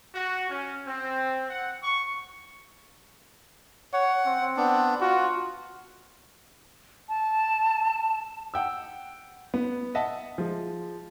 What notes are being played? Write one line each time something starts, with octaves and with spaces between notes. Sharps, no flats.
F#4
C#4
C4
F#5
C#6
C#5 F#5
C4
B3 D4
F4 F#4
A5
F#5 G5 E6
B3
D#5 E5 F#5 A5
F3 G#3